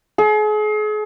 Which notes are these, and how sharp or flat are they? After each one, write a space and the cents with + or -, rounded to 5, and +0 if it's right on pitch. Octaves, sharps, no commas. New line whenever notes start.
G#4 +40